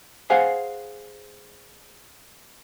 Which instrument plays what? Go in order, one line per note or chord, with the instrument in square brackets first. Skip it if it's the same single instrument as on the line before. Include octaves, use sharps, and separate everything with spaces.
[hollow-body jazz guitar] G#4 C5 F5 F#5 G#5